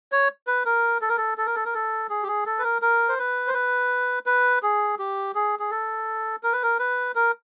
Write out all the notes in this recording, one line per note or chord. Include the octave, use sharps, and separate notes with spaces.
C#5
B4
A#4
A4
A#4
A4
A4
A#4
A4
A#4
A4
G#4
G4
G#4
A4
B4
A#4
A#4
C5
B4
C5
B4
B4
G#4
G4
G#4
G#4
A4
A#4
B4
A#4
B4
A#4